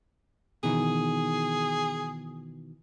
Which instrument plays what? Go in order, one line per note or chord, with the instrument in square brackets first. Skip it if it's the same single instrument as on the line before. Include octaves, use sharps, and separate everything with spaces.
[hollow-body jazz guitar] B2 D#3 E3 [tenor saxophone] G#4